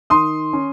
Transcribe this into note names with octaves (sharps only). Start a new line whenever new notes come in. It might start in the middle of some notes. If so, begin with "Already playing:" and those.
D#3 C6 D#6
C#4